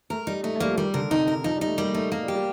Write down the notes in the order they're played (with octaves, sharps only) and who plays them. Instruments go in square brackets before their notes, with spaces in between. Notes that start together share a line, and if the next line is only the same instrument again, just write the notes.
[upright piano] A3 [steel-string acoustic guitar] A#4
[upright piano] G3 [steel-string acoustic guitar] D#4
[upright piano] A3 [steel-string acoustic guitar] D#4
[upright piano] A3
[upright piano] G3 [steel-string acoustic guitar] A#3
[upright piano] F3
[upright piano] D#3 [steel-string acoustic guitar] G3
[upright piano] D3 [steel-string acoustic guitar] A#4
[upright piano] C3 [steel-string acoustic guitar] D#4
[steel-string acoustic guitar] A#4
[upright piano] F3 [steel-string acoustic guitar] D#4
[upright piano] G3
[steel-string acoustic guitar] D#4
[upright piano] A3
[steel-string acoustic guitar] G3 [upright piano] A#3
[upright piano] A3 [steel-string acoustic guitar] D#4
[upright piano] A3 [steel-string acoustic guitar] A#3
[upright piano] G3
[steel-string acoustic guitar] G4
[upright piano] G3